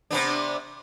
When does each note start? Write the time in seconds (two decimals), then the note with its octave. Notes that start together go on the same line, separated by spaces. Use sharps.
0.10 C3 B3 D4